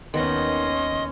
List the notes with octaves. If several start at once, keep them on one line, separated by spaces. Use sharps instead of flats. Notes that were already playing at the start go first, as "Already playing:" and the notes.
D#2 D#3 B3 C#4 D#5 C6